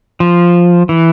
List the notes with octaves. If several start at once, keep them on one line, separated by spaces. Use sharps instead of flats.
F3
E3